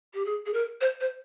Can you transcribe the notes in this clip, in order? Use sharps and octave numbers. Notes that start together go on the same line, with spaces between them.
G4
G#4
G#4
A#4
C5
C5